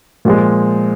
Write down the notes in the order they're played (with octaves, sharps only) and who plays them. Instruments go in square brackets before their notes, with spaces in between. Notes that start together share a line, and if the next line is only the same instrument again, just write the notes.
[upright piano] A#2 F3 G#3